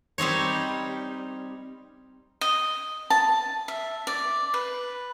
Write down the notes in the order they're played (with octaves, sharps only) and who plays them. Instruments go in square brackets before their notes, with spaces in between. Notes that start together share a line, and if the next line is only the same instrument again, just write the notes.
[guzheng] G3 C4 D#4 C#5
[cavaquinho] D#5
A5
E5
D5
B4